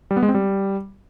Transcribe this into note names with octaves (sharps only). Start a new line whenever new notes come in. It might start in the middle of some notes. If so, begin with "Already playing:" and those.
G3
B3
G#3
C4
G3